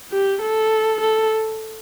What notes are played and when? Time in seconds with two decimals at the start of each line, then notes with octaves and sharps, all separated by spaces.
0.12 G4
0.42 A4
1.01 A4